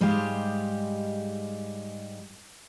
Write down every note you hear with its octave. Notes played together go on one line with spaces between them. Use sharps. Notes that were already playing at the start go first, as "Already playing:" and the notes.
G#2 G3 G#3 G4 F5